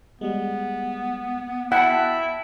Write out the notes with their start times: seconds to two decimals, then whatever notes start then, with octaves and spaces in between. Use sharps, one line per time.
0.21 G3 G#3 B3
1.72 E4 F#5 G5 A5